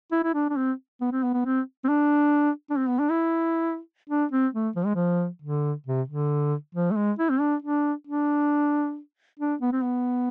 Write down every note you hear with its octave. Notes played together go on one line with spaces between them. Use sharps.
E4
E4
D4
D4
C4
B3
C4
B3
B3
C4
C4
D4
D4
C4
B3
D4
E4
D4
C4
A3
F3
G#3
F3
D3
C3
D3
F3
A3
G#3
E4
C4
D4
D4
D4
D4
B3
C4
B3